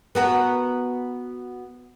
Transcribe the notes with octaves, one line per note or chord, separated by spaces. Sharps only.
B3 F#4 A#4